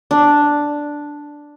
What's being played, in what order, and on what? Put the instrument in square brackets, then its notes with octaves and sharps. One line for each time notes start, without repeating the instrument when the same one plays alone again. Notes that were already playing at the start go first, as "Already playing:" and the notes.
[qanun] D4